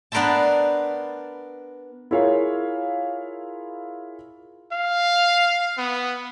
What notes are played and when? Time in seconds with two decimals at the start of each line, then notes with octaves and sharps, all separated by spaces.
0.12 B3 D4 A#4 C5 E5 A5
2.11 E4 F4 G#4 A#4 C#5 F5
4.72 F5
5.78 B3